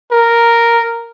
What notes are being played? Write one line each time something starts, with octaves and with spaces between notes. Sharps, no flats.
A#4